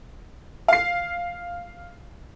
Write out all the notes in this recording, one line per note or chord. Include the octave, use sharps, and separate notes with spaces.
F5 C7